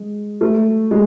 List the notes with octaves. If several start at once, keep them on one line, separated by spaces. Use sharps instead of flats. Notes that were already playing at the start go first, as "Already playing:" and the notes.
Already playing: G#3
A3
G#3